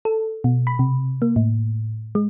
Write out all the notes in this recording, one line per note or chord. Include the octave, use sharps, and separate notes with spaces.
A4
B2
B5
C3
A#3
A2
G#3